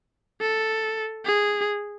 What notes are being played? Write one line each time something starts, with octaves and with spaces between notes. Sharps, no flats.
A4
G#4